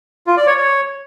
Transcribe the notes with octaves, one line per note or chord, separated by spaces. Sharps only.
F4
D5
C#5
C#5